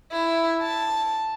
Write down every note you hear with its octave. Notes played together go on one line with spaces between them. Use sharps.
E4
A5